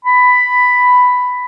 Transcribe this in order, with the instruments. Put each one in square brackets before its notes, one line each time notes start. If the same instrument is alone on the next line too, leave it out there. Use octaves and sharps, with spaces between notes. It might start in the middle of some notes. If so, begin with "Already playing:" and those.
[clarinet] B5